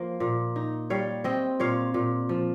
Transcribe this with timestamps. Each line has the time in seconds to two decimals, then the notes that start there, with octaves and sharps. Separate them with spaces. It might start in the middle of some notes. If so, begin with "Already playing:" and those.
Already playing: F3 A#3 C5
0.20 A#2
0.56 D#4
0.90 G3 C#5 F5
1.24 C4 D#5 G5
1.60 A#2 C#5 F5
1.94 A#2
2.29 F3